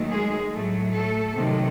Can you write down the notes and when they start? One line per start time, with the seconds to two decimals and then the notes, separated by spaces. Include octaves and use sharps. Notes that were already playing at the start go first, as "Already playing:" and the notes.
Already playing: D#2 D#3 F#3 A3
0.10 G#3 G#4
0.52 A2 F#3 A3
0.93 A3 A4
1.35 C3 D#3 F#3 A3